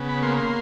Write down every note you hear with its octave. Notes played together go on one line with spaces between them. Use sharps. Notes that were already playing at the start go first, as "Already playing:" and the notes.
Already playing: C#3 B3
B5
A#3 C6
C6